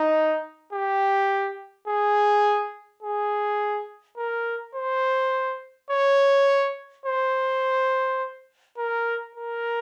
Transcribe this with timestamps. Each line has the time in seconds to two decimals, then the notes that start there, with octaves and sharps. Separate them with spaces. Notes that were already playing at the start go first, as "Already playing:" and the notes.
Already playing: D#4
0.73 G4
1.88 G#4
3.03 G#4
4.17 A#4
4.75 C5
5.91 C#5
7.06 C5
8.78 A#4
9.35 A#4